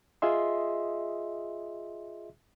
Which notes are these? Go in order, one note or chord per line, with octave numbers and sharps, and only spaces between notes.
F4 G#4 D#5 E5 C6